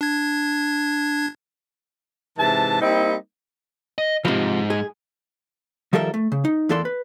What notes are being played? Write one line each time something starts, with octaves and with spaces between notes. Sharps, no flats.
D4 G#6
G#2 C3 E3 A5
G3 A#3 C4 D#4 E4
D#5
C#2 G#2 C3 F3
G#4
D#3 F3 G3 A4 A#4 E5
A3
C#3
D#4
E2 E3 A#3 A4 D5 C6
B4